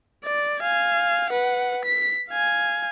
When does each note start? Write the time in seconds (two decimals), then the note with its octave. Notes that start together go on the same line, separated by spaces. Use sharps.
0.24 D5
0.60 F5 G#5
1.30 B4 F#5
1.85 B6
2.30 F5 G#5